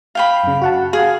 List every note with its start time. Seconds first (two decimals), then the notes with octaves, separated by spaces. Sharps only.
0.15 F5 G5 B5
0.44 F#2 C#3
0.62 F#4 F#5 A5
0.93 G#4 F5